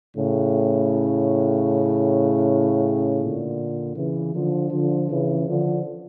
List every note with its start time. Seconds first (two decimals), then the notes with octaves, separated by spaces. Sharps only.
0.15 A2 C#3
3.19 A#2 D3
3.95 C#3 E3
4.33 D3 F3
4.71 D3 F3
5.09 C#3 E3
5.47 D3 F3